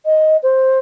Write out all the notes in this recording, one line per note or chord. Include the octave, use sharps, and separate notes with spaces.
D#5
C5